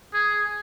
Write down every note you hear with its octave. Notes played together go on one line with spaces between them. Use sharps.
G#4